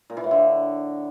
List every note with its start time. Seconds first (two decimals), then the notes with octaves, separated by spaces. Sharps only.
0.10 A#2
0.17 E3
0.24 A2
0.31 D3